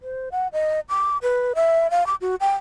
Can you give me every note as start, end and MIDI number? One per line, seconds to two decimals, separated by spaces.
0.02 0.29 72
0.32 0.48 78
0.53 0.80 75
0.89 1.17 86
1.22 1.53 71
1.55 1.90 76
1.91 2.06 77
2.07 2.15 86
2.21 2.35 66
2.41 2.54 79